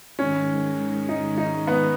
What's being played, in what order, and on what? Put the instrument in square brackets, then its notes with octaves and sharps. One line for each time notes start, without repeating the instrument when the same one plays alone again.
[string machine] G#2 D#3 G#3 [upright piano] C#4
[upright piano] D#4
D#4
B3 B4